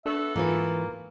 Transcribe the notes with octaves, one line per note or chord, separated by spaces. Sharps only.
B3 D4 F#4 A4 E5
G#2 E3 A#3 F4 B4